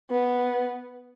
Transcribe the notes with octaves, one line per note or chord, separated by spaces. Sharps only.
B3